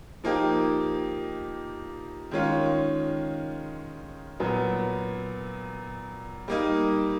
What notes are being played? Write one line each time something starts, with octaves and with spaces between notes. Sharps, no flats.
F3 A#3 D#4 G4
D#3 G#3 C#4 F4
A#2 F#3 B3
G3 A#3 D#4